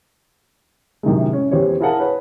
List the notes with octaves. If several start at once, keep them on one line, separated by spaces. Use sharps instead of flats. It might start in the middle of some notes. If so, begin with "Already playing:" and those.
F#2 A2 C3 D#3 G#3
C#4
E2 G4 C5 C#5
E4 G#4 A#4 F5 F#5 A5
B4 C#5